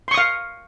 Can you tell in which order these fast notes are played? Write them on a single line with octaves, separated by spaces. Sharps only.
C6 C#6 D#6 F5